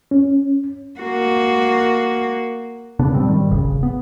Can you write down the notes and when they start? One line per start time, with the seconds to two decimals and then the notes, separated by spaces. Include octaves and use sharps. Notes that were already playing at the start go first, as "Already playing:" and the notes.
0.11 C#4
1.00 A#3 F#4
2.99 C#3 B3 D4
3.14 A#2 G3 C4
3.27 G#2 D#3 G3
3.50 D#1 G#1 C#3
3.83 B3